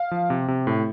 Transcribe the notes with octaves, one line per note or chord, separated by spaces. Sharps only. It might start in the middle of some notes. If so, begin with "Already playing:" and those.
Already playing: F5
F3
C3
C3
A2